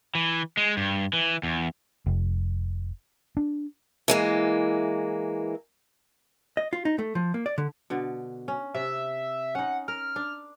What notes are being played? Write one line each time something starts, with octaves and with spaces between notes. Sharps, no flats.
E3
G#3
G2
E3
E2
F1
D4
E3 G#3 A#3
D#5
F4
D#4
A3
F3
A#3
D5
D3
B2 D3
C#4
C3 E5
C#4 D#4 F#5
A#4 F6
D4